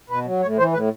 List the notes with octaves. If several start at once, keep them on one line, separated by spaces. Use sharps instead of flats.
B2 B4
F#3
A2 C#5
E3 C5
A2 B4